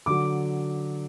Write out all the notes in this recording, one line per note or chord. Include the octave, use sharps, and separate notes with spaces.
D3 F#3 D6